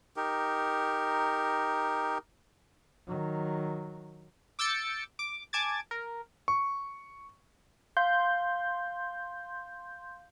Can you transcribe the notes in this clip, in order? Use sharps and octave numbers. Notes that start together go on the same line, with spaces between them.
D#4 G4 A#4
D#3 F#3
D6 E6 G6 A6 C#7
D6
G#5 A5 D6 G#6 A6
A#4
C#6
F5 C6 G6